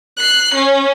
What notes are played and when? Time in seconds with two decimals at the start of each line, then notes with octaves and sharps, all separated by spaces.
0.17 F#6 C7
0.54 C#4